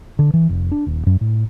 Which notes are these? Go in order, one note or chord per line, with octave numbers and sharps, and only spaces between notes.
D3
E3
F1
D4
D#1
F#2
A2